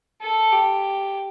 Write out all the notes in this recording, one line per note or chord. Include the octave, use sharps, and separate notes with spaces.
A4
G4